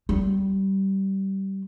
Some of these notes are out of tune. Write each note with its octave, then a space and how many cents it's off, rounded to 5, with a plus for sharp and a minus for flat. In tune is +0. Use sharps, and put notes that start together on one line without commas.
G3 -20